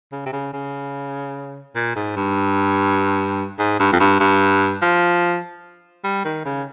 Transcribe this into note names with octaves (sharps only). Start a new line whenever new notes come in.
C#3
C3
C#3
C#3
A#2
G#2
G2
G#2
G2
F2
G2
G2
F3
G3
D#3
C#3